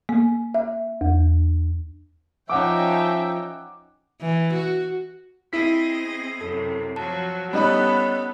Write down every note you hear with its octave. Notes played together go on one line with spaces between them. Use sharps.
A#3
E5
E2
F3 C#4 D#4 E5 F#5 G5 D6
E3
F#4
C4 E4 G#4 D#5 B6
F#2 C3 A4
F3 F#3 A5
G3 B3 C#4 D#4 A4 C#5 D#5 B5